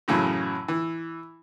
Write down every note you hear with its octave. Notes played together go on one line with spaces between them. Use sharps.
F#2 A2 C#3 E3 F#3
E3